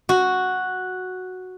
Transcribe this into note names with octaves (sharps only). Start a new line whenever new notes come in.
F#4